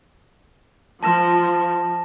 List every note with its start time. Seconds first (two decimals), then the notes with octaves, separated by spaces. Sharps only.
1.03 F3 A5 A#6 E7